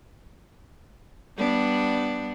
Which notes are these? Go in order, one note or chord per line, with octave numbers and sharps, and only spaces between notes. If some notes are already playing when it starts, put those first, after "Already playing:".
G3 B3 D4